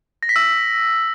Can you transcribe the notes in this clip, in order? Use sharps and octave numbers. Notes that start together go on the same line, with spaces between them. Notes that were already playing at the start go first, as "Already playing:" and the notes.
A#6
B6
E6